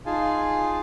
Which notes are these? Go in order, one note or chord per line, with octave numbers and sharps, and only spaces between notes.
D#4 F4 G#4 F5 G#5 A5